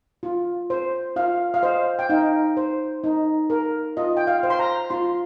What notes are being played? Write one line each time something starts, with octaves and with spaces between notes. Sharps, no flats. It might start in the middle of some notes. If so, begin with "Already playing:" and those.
F4
C5
F4 F5
F5
C5 D#5
G5
D#4 F5
C5
D#4
A#4
F4 D#5
G5
F5
C5
C6
A#5
F4 C6